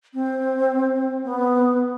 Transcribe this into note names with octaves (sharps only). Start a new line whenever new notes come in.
C4
B3